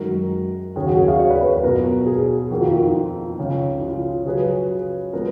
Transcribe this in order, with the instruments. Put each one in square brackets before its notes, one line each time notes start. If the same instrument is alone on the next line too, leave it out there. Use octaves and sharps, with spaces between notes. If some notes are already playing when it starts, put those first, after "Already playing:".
Already playing: [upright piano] F#2 D#3 G#3 D#4 F#4 [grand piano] A#4
[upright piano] D#2 C#3 F#3 C#4 [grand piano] G#4
[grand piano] F#4
G#4
F5
C#5
B4
B4
B4
[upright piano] B2 F#3 B3 F4 [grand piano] A#4
[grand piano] G#4
[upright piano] F2 D#3 A#3 [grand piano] F#4
[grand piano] F4
F4
D#4
[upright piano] C#2 C#3 F3
[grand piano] F4
[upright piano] C#3 F#3 C#4 G#4 B4
[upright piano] F3 G#3 B3 [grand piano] A#4